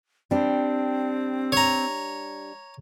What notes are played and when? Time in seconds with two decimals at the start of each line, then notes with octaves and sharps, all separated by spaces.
0.31 G3 C4 D4
1.52 C#5 A#5